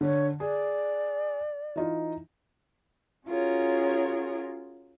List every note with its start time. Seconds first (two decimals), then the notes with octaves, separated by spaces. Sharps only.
0.01 D3 C#5
0.40 G#4 D5
1.76 E3 D#4 F4
3.27 C#4 F4 F#4 G#4 A#4 C#5